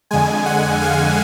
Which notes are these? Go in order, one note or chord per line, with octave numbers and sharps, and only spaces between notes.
F2 D3 G#3 G#5
F#5
F5